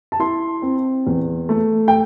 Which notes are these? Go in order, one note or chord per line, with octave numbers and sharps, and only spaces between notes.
A5
E4 C6
C4
E2
A3
G5